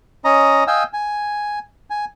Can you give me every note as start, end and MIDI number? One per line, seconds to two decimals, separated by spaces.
0.25 0.64 61
0.25 0.64 75
0.25 0.64 82
0.67 0.84 75
0.67 0.84 77
0.67 0.84 79
0.67 0.84 80
0.67 0.84 88
0.93 1.59 80
1.90 2.05 80